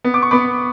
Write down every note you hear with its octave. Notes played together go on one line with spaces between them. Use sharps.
B3
D6
C#6
B3 B5 D6